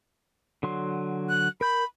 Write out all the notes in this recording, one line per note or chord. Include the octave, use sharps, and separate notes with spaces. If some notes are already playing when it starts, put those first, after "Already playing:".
D3 F#3 C6
F#6
A#4 B5 G6